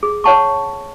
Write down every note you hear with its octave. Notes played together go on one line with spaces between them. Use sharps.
G#4
C#5 F#5 A5 C#6